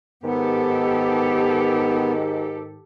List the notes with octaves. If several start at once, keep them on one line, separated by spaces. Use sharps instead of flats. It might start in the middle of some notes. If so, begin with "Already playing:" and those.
G#2 D#3 B3 G4 A4